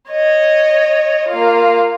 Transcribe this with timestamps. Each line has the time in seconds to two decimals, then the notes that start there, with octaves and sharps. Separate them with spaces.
0.10 C#5 D#5
1.29 A#3 F4